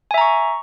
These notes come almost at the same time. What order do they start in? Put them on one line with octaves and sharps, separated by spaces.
G#5 E5 A#5 C#6